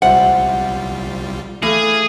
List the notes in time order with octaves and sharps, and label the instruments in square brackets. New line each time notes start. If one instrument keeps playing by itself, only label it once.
[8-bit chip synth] C2 G3 F4 [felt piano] C5 E5 [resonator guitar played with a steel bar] F#5
[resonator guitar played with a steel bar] E3 [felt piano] A3 A4 [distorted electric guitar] G#4 [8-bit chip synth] F5